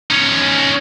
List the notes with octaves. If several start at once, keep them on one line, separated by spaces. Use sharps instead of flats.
C#4 D#4